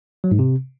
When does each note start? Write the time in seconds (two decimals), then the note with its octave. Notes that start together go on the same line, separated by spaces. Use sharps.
0.24 F#3
0.31 G#2
0.39 C3